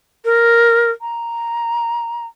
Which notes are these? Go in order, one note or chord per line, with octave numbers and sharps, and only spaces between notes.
A#4
A#5